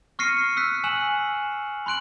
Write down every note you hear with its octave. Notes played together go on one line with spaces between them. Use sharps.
C#6 F6 A#6 C7 C#7 D#7
E6 F#6 B6
G#5 E6 F#6 E7 F#7
B5 C6 F#6 D7 F#7